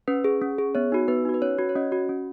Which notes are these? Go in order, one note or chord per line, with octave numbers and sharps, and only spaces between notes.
C#4 B4
G#4
C#4
G#4
B3 C#5
D#4 F#4
B3 B4
D#4 F#4
B4
C#4 C#5
F#4
C#5
C#4 D#5
F#4
C#4